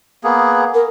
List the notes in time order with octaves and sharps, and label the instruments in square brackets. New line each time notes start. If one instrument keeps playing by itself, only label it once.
[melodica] A#3 B3 G#4
[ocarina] A#4